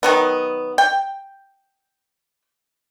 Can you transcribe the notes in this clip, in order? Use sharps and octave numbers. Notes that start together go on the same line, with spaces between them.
D#3 F#3 B3
G5